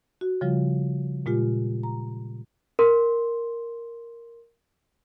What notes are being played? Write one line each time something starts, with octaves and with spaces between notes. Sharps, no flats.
F#4
C#3 F3 G3 F4
A#2 G#3 F4 G4
A#5
A#4 C6